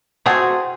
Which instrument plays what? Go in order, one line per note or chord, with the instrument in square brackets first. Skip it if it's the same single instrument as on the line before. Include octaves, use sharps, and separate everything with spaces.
[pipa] A3 C4 F4 G#4 [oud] F#4